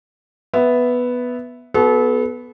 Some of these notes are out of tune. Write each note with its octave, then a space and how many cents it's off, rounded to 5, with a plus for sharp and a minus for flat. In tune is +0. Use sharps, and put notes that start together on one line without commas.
B3 +0 E5 +0
B3 +0 F#4 +0 A4 -35